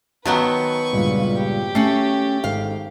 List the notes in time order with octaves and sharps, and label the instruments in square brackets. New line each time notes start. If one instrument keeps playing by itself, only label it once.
[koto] D#3 F#3 B3 [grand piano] F#4 [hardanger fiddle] B4 C#6 [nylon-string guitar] A5
[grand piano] C#2 G2 A#2
[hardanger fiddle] G4
[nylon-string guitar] A3 C#4 [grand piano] C7 C#7 F#7
[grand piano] G#1 A4 [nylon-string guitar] F5